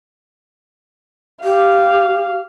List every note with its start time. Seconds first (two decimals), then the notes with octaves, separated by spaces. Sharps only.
1.44 G4 F5